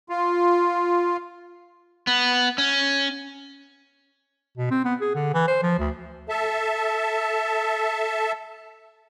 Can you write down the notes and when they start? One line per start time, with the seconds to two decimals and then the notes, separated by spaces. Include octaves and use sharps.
0.09 F4
2.07 B3
2.58 C#4
4.57 B2
4.71 C4
4.85 B3
5.01 G#4
5.15 D3
5.34 E3
5.48 C5
5.63 F3
5.79 D2
6.29 A4 E5 A5